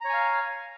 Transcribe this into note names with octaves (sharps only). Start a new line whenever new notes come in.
C#5 F5 G#5 A#5